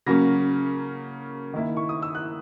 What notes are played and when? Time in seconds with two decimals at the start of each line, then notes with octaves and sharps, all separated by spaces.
0.06 C#3 F#3 A#3 C#4 A#6
1.53 D#3 A#3 E4
1.77 C#6
1.89 D#6
2.02 E6
2.15 F#6